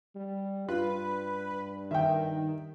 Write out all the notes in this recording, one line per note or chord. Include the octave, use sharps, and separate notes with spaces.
G3
G2 F4 B4
D#3 E5 G5